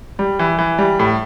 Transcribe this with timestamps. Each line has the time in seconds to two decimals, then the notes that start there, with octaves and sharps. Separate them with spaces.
0.19 G3
0.39 E3
0.58 E3
0.78 G3
1.00 A2